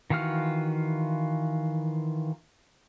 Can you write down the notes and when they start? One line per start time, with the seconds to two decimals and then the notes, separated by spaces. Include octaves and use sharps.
0.10 D#3 E3 F4 F#4 F6